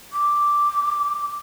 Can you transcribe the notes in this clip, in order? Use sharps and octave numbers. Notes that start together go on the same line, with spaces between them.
D6